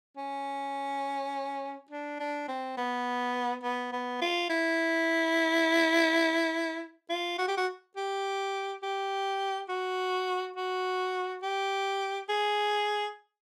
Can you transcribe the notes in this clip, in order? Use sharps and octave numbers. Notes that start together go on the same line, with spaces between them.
C#4
D4
D4
C4
B3
B3
B3
F4
E4
F4
F#4
G4
F#4
G4
G4
F#4
F#4
G4
G#4